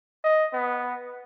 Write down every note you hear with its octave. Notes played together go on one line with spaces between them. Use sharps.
D#5
B3